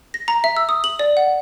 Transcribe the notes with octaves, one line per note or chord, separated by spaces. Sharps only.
A#6
A#5
E5
E6
D#6
F#7
D5
F#5